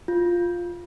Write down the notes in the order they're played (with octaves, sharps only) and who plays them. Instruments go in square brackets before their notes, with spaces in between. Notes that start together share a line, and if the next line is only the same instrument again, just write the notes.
[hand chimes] F4